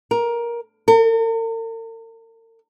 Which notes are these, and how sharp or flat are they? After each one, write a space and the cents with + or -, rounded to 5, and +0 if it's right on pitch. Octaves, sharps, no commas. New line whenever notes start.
A#4 +15
A#4 -45